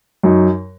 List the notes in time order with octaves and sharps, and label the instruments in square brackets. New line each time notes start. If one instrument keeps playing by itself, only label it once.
[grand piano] F#2 F#3 D#4